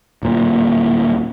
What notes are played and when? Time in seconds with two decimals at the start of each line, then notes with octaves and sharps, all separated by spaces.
0.23 D1 A#2